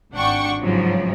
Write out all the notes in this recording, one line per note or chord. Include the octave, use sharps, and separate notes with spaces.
G#1 D4 F#5 G5 C#6
G1 G#2 C#3 F3 F#3